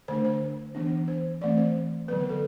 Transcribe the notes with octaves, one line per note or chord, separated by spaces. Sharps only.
D3 A3 D4 C5
C5
E3 B3 D4
C5
E3 A3 C4 D5
C5
D3 F#3 B3 B4
B4
A4